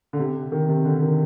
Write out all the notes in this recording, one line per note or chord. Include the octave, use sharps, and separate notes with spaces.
D3
C3
D#3
C3
D3
D#3